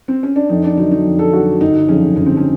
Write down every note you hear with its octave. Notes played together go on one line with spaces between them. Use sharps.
C4
C#4
D4
F2 D#4
D4
D3 F#3 D#4
D#4
F2
A4
D3 F#3 F#4
G1 D#4
F2 C#3 F#3 C#4
G1 C#4
C4
C#4